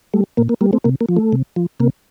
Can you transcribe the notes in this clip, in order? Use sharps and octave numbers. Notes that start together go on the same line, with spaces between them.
G3 A3
A#2 A#3
A#3
G3 A#3
A3 C4
C3 A#3
A#3
F3
A3
C3
F3
C3 A#3